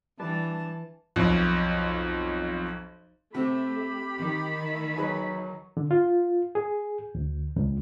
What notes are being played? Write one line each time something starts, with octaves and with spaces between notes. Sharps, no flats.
E3 G3 D4 B4 A5 D6
B1 F2
C3 A3 C4 G4 B5
D#3
A3
D#2 F#3 G#4 B4
D3
F4
G#4
D2
C#2